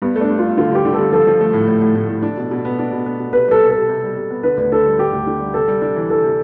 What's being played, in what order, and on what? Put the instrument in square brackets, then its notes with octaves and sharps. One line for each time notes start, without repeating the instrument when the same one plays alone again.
[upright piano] G2 [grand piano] B3
[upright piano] A3
[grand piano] D4
[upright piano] G2
[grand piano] F4
[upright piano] G2
[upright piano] D3 [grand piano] F4
[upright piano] G2 [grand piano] G4
[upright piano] D3
[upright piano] G2 [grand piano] A4
[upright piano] F3 [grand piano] A4
[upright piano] F3
A3
A2
A2
A2
A2
A2
D4
B2
B2
B3
D4
B2
B3
B2
[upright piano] C3 [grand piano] B4
[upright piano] G3 [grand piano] A4
[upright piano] C3
[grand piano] A4
[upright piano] C3
C3
G3
C3
B3
[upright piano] D3 [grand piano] B4
[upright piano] D2
[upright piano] D3 [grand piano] A4
[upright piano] G3
[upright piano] D3 [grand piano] G4
[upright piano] D2
D3
G3
[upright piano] C3 [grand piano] A4
[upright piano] G3
D4
E3
[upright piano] E3 [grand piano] A4
[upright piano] C3